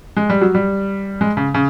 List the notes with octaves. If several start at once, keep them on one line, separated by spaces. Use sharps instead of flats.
G#3
G3
F#3
G3
G#3
C#3
C#3